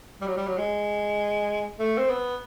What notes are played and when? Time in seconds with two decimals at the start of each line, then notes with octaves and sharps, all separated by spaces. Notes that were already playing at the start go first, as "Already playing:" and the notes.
0.21 G3
0.27 F#3
0.37 G3
0.47 F#3
0.58 G#3
1.79 A3
1.98 C4
2.09 B3